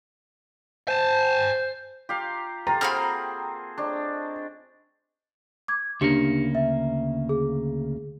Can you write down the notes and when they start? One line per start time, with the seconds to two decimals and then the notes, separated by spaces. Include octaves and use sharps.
0.88 C5 G#5 A5
2.09 F4 G4 F5 A#5
2.67 F4 G4 A4 A#5
2.81 A#3 C4 G#4 F#5 B5 F6
3.78 G#3 D4 C5 C#5
5.68 D6 G#6
6.01 D2 C#3 A#3 D4 G4 C#7
6.55 E5
7.29 G#4